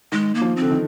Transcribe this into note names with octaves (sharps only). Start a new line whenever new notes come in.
D#3 G#3
A#3
F3
C4
D3
D#3